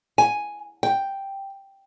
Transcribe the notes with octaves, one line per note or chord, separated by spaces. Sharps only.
G#5
G5